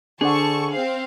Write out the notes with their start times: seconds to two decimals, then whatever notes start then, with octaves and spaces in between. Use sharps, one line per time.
0.21 D3 D4 G#4 C5 F#5 A5 C#6
0.71 C4 F5